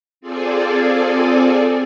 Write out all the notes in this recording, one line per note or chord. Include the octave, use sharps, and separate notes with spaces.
C4 F4 G#4 A4 D5 G#5